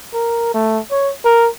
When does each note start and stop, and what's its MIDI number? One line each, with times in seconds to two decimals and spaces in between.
0.14 0.52 70
0.54 0.79 57
0.91 1.12 73
1.25 1.48 70